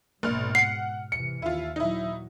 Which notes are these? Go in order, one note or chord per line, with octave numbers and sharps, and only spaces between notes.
A#1 G#2 B2 F6
F#5 C7 C#7
C3 E3 C#7
D#2 E4 F4
A#2 E3 F#3 D#4 E4